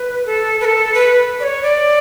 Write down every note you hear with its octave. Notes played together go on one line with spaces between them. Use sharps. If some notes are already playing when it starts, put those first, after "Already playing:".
Already playing: B4
A4
B4
A4
B4
D5
C#5
D5